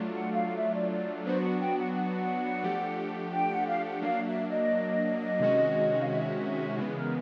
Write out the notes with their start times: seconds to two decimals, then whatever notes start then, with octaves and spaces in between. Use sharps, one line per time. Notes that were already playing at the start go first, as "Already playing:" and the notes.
Already playing: F#3 A3 D4 F4
0.10 F#5
0.33 F5
0.56 E5
0.74 D5
0.91 D5
1.25 F#3 B3 D4 F#4 C5
1.42 F#5
1.60 G5
1.78 F#5
1.94 F#5
2.64 F3 A3 D4 G4
3.33 G5
3.50 F#5
3.67 F5
3.84 F#5
4.02 F#3 A#3 D4 F5
4.25 E5
4.48 D#5
5.40 C3 D#3 G#3 C#4 F#4
6.01 F5
6.09 E5
6.78 C#3 E3 G#3 B3 B4
6.96 A#4